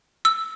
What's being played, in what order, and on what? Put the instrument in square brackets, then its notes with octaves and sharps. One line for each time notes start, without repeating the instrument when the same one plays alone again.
[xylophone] E6